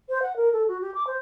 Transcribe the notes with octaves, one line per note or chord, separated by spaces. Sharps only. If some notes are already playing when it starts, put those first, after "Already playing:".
C5
F#5
A#4
A4
F#4
G4
D6
C5